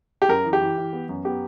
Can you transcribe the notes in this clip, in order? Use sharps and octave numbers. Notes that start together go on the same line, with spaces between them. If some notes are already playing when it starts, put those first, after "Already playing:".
G4
F#2 A#4
E3
G4
E3
E3
B3
F#2
B3 G4